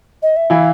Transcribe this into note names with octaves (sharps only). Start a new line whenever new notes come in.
D#5
E5
E3 E4 F5